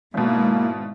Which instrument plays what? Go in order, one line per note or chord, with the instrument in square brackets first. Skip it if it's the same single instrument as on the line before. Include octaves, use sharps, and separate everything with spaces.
[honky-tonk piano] G#1 B2 [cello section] G#3 E4 [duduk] A#3